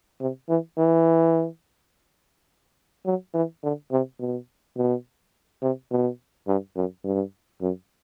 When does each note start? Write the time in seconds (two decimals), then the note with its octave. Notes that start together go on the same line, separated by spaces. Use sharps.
0.21 C3
0.49 E3
0.78 E3
3.06 F#3
3.34 E3
3.63 D3
3.91 C3
4.19 B2
4.77 B2
5.62 C3
5.91 B2
6.47 G2
6.76 F#2
7.04 G2
7.61 F#2